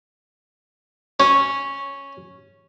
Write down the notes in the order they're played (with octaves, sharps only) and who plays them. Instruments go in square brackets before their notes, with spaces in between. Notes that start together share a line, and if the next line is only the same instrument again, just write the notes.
[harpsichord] C#4